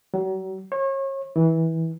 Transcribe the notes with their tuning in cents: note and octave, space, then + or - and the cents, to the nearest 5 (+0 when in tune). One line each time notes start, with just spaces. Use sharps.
F#3 +40
C#5 -35
E3 -20